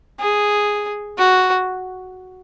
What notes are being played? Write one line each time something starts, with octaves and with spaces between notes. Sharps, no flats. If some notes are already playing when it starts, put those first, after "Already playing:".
G#4
F#4